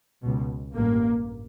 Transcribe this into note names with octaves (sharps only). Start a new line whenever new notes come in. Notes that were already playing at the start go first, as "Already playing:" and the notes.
C#2 B2
A1 G2 A#3